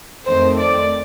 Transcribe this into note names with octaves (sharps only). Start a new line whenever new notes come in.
F2 D#3 A3 C4 C5
D5